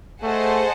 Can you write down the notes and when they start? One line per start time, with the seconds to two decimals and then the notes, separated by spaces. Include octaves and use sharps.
0.23 A3 G#4 C5 D#5 F#5 A5